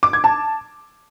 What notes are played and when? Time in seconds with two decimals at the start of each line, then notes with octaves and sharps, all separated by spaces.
0.03 D6
0.13 G#6
0.24 A5